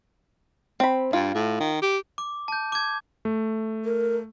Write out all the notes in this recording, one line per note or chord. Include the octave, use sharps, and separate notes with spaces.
C4 B5
G2 F4
A2
D#3
G4
D6
A5 G6
D6 G#6
A3
A#4